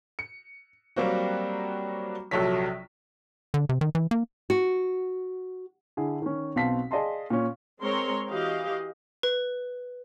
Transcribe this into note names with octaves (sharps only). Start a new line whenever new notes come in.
C#7
F#3 G3 A#3 C4 F#4
A#1 C3 F#3 A4 C#5 B6
D3
C3
D#3
E3
A#3
F#4
D3 E4 G#4
D#3 C#4
B1 B2 C4 F5 A5 B6
G#4 D5 D#5 F5 A5 C6
A#2 C#4
G#3 C4 A#4 C#5 C6
E3 F#4 G4 D#5 F5
B4